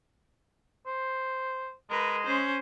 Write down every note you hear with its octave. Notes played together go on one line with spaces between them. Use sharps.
C5
G#3 A#4 B4
C#4 C5